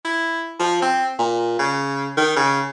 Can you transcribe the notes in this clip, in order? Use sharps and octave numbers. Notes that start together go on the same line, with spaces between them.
E4
F3
C4
A#2
C#3
D#3
C#3